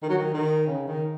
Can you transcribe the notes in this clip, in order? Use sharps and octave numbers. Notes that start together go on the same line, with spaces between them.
D#3
F#3
D#3
D#3
C#3
D#3